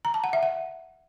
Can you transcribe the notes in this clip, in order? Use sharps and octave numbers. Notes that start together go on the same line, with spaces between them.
A#5
A5
F#5
E5
F#5